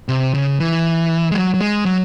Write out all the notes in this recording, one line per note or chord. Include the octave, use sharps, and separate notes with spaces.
C3
C#3
E3
G#3
F#3
F#3
G#3
F#3